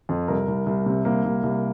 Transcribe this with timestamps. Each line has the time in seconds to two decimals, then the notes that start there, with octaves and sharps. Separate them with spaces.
0.09 F2
0.28 C2 A#4
0.48 C2
0.66 C2
0.86 C3
1.05 C2 A#3
1.24 C2
1.43 C2